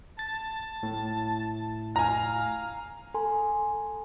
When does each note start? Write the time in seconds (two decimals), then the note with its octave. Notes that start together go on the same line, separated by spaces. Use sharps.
0.19 A5 A6
0.83 A2
1.96 F5 G#5 A#5
3.14 A4 G#5 A#5 C6